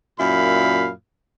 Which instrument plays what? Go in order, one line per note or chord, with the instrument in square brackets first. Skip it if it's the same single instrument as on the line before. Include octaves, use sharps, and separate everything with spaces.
[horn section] F#2 A#2 E4 F5 B5